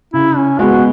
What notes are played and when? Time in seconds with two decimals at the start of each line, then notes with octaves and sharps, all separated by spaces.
0.13 C#3 E4
0.37 C#4
0.59 G#3 B3 F#4